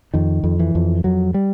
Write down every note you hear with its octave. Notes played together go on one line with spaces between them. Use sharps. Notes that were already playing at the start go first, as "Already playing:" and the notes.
F2 D#3
F2
E3
F2
F2 F#3
G3